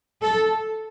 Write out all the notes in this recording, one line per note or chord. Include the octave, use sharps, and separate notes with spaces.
A4